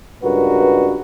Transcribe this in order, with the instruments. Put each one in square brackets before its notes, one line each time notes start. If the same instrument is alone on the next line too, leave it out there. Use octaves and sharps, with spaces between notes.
[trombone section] C#2 G2 F#4 A#4 B4